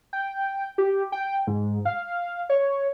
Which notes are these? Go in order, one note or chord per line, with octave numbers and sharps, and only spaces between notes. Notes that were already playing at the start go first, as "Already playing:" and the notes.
G5
G4
G5
G#2
F5
C#5